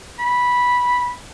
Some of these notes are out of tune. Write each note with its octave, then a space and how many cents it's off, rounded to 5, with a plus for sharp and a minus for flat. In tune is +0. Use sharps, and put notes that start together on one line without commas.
B5 -10